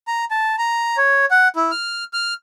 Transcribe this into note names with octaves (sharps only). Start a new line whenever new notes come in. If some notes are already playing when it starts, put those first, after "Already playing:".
A#5
A5
A#5
C#5
F#5
E4
F6
F6